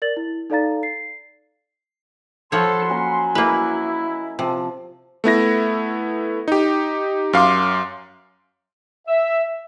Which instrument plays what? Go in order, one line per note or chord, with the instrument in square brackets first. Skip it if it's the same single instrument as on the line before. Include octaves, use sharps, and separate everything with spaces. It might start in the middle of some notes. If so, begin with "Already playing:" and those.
[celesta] A#4 D5 A6 F#7
E4
D#4 A4 D5 F5 A#5 A6
C7
[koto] F3 C#5 [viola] A4 [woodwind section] F#5 B5 C6
[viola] F#3 [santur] A#3 C#4 A#4
[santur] G#3 [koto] A#3 B4 [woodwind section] E4
[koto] C3 [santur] F3 A5
[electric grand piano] A3 B3 E4 A#6
D#4 G4
F#2 F5 C6 D6
[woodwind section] E5